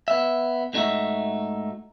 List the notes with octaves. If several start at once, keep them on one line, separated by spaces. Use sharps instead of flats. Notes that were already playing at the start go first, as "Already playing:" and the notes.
B3 E5
G#2 A3 D4 D#4 F#4 E5